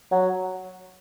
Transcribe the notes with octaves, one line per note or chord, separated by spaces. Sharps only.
F#3